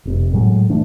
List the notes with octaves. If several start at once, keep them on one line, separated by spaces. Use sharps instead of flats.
F1 C3
A2 F#3 G#3
E3 A3 D4